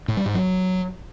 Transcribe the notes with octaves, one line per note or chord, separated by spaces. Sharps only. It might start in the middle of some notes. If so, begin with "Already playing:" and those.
A2
G3
G#2
F#3